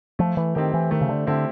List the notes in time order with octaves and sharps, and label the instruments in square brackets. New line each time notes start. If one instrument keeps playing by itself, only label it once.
[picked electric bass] F3 [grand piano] A3
[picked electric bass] E3
[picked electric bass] D#3 [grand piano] C4 E4 G4
[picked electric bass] E3
[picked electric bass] D#3 [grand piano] A3
[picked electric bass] C#3
D3
[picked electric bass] D3 [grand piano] C4 E4 G4